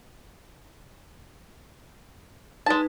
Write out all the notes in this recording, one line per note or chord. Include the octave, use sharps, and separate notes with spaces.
G#3 D#4 B4 A5